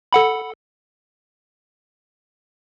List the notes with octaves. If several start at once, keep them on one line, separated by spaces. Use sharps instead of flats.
A4 F#5 B5